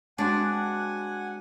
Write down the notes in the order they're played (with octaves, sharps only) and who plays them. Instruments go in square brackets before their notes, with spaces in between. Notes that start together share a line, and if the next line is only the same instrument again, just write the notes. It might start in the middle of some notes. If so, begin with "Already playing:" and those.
[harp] G#3 C4 F#4 [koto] D4 [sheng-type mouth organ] F#5 G#5